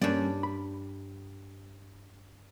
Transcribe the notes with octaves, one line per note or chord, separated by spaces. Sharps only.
G2 G3 A#3 C#4 D5
B5